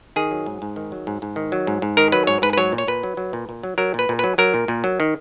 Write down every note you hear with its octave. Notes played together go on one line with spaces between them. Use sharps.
D#3 G#4
F#3
G#2
G#2
D#3
F#3
G#2
G#2
D#3
F#3
G#2
G#2
D#3 A#4
F#3 B4
G#2 C#5
G#2 B4
B4
F#3 C#5
A#2
C#5
A#2 B4
F#3
F#3
A#2
A#2
F#3
F#3 A#4
A#2 B4
A#2
F#3 B4
F#3 A#4
A#2
A#2
F#3
D#3